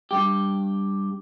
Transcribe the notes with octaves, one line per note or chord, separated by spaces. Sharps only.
G2 G4